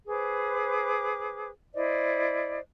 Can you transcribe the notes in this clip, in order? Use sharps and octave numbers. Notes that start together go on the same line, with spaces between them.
G#4 B4 C5 D6
E4 C5 D5 D#5